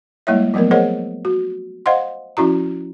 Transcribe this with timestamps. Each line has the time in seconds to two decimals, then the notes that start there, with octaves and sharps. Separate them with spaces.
0.27 G3 G#3 A#3 E4 C#5 E5
0.54 F3 F#3 A3 B3 A#4
0.71 G#4 A#4 C5 C#5 D#5 F#5
1.25 F#4
1.86 C5 D#5 F5 F#5 C6
2.37 F3 C#4 E4 F#4 A#5